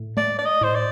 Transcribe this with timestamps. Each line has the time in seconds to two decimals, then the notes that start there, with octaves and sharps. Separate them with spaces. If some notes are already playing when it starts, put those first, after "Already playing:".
Already playing: A2
0.17 A3 D5
0.39 D5
0.46 D#5
0.61 A2 C5
0.75 D5